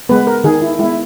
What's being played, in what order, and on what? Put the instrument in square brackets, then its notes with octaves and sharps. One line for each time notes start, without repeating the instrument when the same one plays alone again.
[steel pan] G#3 B3 B4
A#4
D#3 G#4
E4
G#3 B3 E4